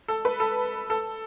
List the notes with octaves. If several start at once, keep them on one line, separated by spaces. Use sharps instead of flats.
A4
B4
A4
A4